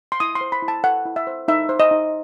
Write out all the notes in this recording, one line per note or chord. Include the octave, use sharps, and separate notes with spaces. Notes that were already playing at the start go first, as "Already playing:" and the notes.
C6
E4 D#6
C6
C5
B5
E4
A5
A4 F#5
E4
E5
C5
D#4 E5
C5
D#5
D#4